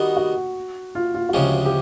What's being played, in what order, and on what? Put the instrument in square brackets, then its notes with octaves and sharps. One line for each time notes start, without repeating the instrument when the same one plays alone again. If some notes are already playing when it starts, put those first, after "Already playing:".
Already playing: [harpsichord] D#3 G3 B3 D#4 [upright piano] F#4
[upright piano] F#4
F4
F4
F#4
[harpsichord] D2 C#3 F3 G#3 C#4 [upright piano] G4
[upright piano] G4